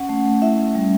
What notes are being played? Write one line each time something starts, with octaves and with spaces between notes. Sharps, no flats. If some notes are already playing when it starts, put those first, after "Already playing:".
Already playing: C#4 F#5
A3
A3
E4 E5
C#4
G3